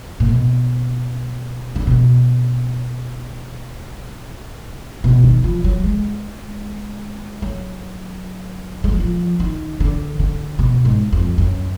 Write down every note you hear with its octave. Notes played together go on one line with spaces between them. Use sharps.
A#2
B2
D3
B2
B2
D#3
F3
F#3
G#3
F#3
G#3
F#3
F3
D#3
D3
D3
B2
G#2
F2
F#2